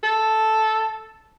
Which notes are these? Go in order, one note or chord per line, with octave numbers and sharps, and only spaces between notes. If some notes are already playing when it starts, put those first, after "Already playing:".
A4